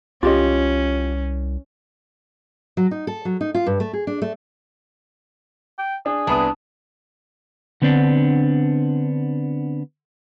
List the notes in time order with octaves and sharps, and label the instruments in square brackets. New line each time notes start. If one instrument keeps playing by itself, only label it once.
[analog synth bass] C2 [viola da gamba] C#4 [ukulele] F4 G4 D#5
[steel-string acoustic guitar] F#3
D#4
A4
F#3
D#4
F4
G2
A3
G#4
D4
A3
[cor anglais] G5
[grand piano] D4 [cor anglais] G#4
[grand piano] C2 B3 D#6 [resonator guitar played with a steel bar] D4
[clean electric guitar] D3 B3 C4 D4